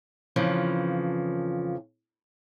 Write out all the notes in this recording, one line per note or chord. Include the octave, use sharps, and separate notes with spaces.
F2 C#3 E3 F3